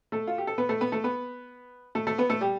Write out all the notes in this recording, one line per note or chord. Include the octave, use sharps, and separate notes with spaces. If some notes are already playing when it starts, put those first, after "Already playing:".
A3 A4
F4
G4
A4
B3 B4
A3 A4
B3 B4
A3 A4
B3 B4
A3 A4
A3 A4
B3 B4
A3 A4
G3 G4